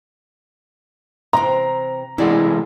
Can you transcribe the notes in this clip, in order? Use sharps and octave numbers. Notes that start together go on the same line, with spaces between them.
C3 E3 C4 A#5
C3 E3 G#3 A3 E4 D5 F#5